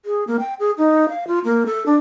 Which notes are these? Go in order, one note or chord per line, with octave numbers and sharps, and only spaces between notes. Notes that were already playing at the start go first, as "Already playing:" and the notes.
G#4
A#3
G5
G#4
D#4
F5
F4
A#3
A4
D4